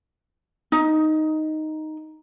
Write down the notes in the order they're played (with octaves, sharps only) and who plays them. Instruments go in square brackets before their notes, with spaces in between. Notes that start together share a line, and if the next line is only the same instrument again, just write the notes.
[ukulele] D#4